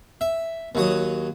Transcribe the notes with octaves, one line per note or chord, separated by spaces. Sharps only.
E5
D#2 F#3 D#6